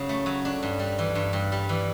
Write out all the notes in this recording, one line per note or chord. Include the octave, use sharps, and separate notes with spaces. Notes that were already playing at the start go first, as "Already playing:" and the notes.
Already playing: C#3 F#3
A3
F#3
D4
G2
G3
E3
G2
G2
G3
E3